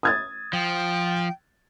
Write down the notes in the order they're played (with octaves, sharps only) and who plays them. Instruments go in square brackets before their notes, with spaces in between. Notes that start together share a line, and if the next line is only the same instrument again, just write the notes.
[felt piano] D#6 G#6 A6
[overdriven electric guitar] F3 [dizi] G5